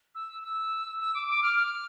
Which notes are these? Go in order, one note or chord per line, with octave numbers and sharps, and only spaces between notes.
E6
E6
E6
D6
D6
F6
F6